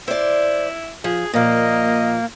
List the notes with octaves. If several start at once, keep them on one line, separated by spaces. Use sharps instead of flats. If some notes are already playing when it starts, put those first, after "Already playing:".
E4 C5 D5
F3 G#4
A#2 F3 A#3 D#5